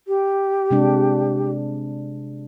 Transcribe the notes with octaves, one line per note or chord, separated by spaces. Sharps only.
G4
C3 G#3 D4